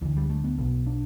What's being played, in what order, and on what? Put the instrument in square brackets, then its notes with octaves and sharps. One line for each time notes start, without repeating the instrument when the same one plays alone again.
[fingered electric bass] D2 D3 E3
G3
A3
B3
B1 B2 B3
D4